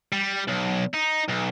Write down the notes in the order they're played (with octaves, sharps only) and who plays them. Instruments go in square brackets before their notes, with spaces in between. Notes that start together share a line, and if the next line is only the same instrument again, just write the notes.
[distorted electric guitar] G3
B1
D#4
B1